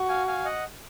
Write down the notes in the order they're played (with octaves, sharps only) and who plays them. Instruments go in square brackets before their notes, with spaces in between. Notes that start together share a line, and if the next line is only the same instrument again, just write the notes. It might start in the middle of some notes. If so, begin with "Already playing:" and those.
Already playing: [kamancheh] F#4
[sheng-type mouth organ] F5 G#5
F5 G#5
D#5 F#5